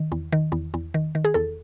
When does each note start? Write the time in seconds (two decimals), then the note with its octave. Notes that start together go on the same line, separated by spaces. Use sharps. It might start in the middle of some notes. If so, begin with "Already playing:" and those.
Already playing: D#3
0.12 E2
0.32 D#3
0.52 E2
0.74 E2
0.94 D#3
1.15 D#3
1.25 G#4
1.34 E2 A4